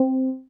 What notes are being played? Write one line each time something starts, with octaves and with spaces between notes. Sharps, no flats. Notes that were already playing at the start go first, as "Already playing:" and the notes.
Already playing: C4